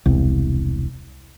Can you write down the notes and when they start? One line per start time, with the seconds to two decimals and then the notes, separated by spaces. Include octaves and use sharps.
0.06 E1 C2